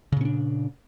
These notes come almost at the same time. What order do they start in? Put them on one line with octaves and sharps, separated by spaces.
C#3 A#2 C#4 D4